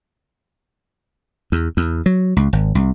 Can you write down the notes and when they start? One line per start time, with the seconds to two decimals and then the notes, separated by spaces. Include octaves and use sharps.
1.52 E2
1.77 E2
2.06 F#3
2.37 C#2
2.53 G#1
2.75 C2